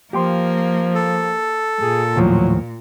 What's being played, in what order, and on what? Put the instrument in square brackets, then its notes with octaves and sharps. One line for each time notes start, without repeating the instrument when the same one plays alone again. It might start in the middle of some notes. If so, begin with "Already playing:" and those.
[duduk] F3 [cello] A#3 [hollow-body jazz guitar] G4 G5 C6
[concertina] A4
[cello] A#2 [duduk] G#4
[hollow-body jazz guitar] D#2 A2 F3 [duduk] F#3